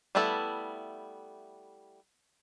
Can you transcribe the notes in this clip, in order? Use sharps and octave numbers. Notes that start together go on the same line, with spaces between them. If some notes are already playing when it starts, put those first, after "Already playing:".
G3 A3 B3 E4 A4